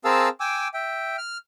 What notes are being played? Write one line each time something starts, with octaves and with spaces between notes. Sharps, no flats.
C4 G#4 A#4 F5 A5 E6
G5 G#5 D6 E6
E5 G5
F6